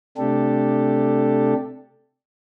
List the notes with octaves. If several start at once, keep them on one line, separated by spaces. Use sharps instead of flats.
C3 A3 D4 G4 A4